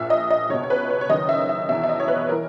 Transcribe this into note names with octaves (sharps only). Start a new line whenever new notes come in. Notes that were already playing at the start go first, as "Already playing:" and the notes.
Already playing: A#1 A#2 E5
D#5
D#5
C#2 B2 C#5
C#5
B4
C#5
C#5
F#1 F#2 D#3 D#5
E5
E5
E2 B2 E5
E5
D#5
C#5
B4
E3 A#4